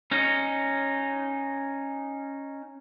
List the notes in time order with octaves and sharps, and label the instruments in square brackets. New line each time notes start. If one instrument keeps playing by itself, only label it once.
[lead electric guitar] C#4 D#4